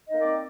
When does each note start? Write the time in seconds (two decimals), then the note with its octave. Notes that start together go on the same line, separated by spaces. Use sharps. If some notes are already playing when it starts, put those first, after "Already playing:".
0.06 D#5
0.10 D#4
0.13 A#3
0.16 C4
0.20 D5